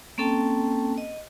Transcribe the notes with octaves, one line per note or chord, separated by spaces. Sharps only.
A#3 C4 C#4 A4 G5 A5
D#5